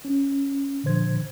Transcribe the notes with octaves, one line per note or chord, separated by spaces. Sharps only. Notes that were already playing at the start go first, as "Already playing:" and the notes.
C#4
A#2 D3 F3 C5 G#6